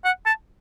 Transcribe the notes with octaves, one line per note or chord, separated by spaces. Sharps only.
F#5
A5